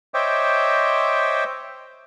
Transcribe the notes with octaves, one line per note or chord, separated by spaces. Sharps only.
C5 C#5 D#5 E5 G5 D6